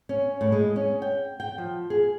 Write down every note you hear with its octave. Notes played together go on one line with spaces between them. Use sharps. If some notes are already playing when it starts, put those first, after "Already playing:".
C#4
A2
G#3
C#4
G5
G5
F3
G#4